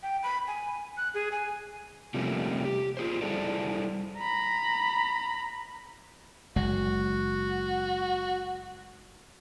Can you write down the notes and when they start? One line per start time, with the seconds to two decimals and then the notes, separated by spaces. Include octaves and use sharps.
0.03 G5
0.23 B5
0.48 G#5
0.97 F#6
1.14 G#4
1.32 G#5
2.14 C3 F3 G3 A3 A#3 C#4
2.65 G4
2.97 F4 G#4 C5
3.21 G3 E4 G#4 A4 C5 D5
4.18 A#5 B5
6.56 F#1 G#3 F#4